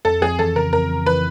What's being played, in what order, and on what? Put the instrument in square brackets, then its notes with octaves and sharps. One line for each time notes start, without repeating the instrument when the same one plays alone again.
[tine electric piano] F2 [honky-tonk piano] A4
[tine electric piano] F2 [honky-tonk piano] G#4
[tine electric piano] E3 [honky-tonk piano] A4
[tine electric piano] C#3 [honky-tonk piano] A#4
[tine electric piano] F2 [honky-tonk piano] A#4
[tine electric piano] F2
[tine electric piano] E3 [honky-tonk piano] B4